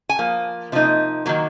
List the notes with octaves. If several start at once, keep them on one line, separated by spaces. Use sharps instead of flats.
G#5
F3 A#3
C3 F3 A#3 D#4
D#3 F#3 A#3